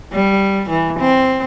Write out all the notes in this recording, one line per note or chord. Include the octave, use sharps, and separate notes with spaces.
G3
E3
C4